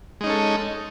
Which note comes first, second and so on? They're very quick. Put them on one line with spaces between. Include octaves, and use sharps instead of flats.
G#3 D#4 C#4 A4